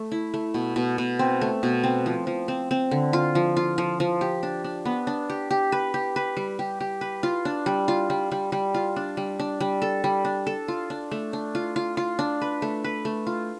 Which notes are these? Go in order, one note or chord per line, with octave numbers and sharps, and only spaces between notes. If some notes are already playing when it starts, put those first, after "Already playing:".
Already playing: A3
E4
A3
B2
B2
B2
C4
A3
B2
C4
F3
F3
C4
C4
D3
F4
F3
F4
F3
F3
G4
D4
D4
B3
D4
G4
G4
B4
G4
B4
G3
G4
G4
B4
F4
D4
G3
F4
G3
G3
G3
F4
D4
G3
D4
G3
A4
G3
D4
A4
F4
D4
A3
D4
F4
F4
F4
D4
B4
A3
B4
A3
F4